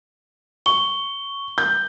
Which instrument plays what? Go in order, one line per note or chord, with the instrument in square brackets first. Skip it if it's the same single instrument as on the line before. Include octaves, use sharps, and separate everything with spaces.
[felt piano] C#6 [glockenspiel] G7
[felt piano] G6